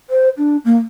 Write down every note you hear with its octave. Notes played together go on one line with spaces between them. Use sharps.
C5
D4
A#3